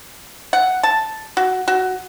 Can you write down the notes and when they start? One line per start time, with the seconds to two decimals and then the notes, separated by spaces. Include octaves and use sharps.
0.53 F#5
0.83 A5
1.37 F#4
1.68 F#4